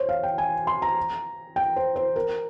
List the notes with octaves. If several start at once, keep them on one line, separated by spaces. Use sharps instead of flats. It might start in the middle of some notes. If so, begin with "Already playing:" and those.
Already playing: C5 C#5
F5
G5
G#5
C6
A#5
G5
C5
C5
A#4